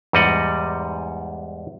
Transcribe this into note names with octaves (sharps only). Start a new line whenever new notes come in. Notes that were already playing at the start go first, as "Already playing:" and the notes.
E2 G#2 G3 D#5 F#5